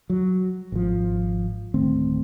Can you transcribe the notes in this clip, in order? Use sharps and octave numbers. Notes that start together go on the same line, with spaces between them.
F#3
G#1 F3
D1 D#3 A3 C4